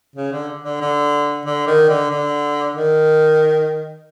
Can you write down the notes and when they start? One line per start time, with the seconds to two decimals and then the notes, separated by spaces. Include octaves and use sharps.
0.16 C#3
0.32 D3
0.64 D3
0.81 D3
1.46 D3
1.67 D#3
1.89 D3
2.10 D3
2.75 D#3